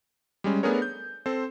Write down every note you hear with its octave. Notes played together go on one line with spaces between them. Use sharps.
G3 G#3 C#4
A3 B3 D4 G#4 A#4 C#5
G6
C4 A4 C5